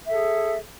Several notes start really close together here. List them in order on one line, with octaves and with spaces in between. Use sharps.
E5 A4 G#4